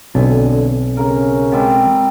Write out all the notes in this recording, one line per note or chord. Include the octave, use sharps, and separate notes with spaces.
B1 D3 C4 G#5
C#3 A#4
G3 G#3 C4 A4